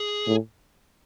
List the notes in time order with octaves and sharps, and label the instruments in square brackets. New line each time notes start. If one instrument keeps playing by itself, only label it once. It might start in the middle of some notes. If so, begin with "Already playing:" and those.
Already playing: [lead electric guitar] G#4
[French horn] A2